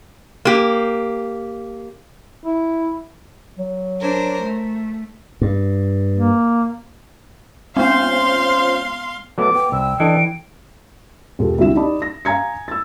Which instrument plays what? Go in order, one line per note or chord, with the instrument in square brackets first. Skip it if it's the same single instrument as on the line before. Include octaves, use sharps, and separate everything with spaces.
[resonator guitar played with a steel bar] A#3 G4
[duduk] E4
[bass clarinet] F#3
[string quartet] D4 A#4 C5
A3
[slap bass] G2
[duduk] A#3
[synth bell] G#3 B3 [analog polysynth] C#4 F4 C5 [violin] F5 C6
[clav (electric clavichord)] F#3 A3 B3 [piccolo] D6
[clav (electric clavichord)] B3 [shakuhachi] G5
[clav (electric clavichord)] C2 [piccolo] E6
[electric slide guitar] E3 [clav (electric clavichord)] D4 A4 D#5 [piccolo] D7
[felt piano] E1 F4 G4 A4
C2 D3 F#4 E5 E7
D#4 G4 D5 D#5 A5 B5
A#6
F5 G#5 A#5 G#6 C#7
E6 A6